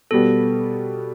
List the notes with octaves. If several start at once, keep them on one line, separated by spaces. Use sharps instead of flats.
B2 G3 B3 A4